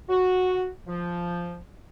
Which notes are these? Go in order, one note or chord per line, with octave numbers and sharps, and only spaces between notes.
F#4
F3